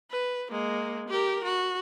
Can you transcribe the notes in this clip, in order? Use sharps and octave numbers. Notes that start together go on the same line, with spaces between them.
B4
G#3 A#3
G4 A#4
F#4